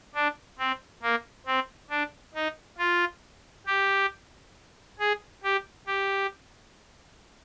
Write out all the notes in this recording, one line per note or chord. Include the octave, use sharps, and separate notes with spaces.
D4
C4
A#3
C4
D4
D#4
F4
G4
G#4
G4
G4